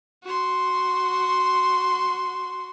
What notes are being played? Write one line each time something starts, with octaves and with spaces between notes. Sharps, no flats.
F#4 C6